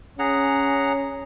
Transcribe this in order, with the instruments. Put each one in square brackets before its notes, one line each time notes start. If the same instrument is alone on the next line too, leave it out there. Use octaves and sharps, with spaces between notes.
[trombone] C#4 [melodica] G#4 F#5 A#5